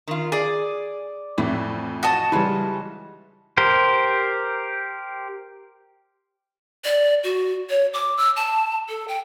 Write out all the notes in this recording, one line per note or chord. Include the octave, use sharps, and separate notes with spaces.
D#3 F4
G#4 D5
F2 A2 E3
F#4 D#5 A5
C#3 E3 G3 G#3
G4 A#4 C5
D5
F#4
C#5
D6
E6
A5
A4
G5